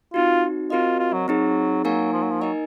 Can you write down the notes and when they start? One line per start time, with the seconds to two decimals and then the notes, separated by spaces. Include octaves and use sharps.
0.14 C4 D#4 F4 F#4
0.70 C4 F4 F#4 A#4 D#5
0.99 F4
1.13 F#3
1.28 F#3 C4 D#4 G#4
1.84 F#3 A#3 D#4 A#4 F5 G#5
2.13 F3
2.23 F#3
2.31 F3
2.41 F#3 D#4 A#4 D#5 G#5